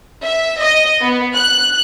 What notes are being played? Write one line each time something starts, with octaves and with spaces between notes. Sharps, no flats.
E5
D#5
B3
F#6